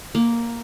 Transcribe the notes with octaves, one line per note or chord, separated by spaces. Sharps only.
A#3